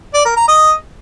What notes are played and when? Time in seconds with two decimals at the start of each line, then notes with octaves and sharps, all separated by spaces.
0.14 D5
0.25 A#4
0.36 A#5
0.48 D#5